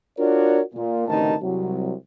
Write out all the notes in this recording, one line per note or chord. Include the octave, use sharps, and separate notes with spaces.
D4 F4 F#4 A#4 C#5 D5
A#2
A1 D2 C3 D#3 D#4 A5
C2 F#3